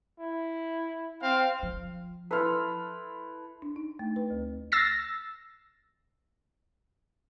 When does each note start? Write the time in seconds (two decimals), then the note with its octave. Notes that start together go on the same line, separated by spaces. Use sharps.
0.20 E4
1.23 C4 F5
1.63 F3
2.31 E4 A4 B4 C6 F6
3.62 D4
3.76 D#4
3.99 A3
4.16 B4
4.30 D2
4.72 E6 A6 A#6 C7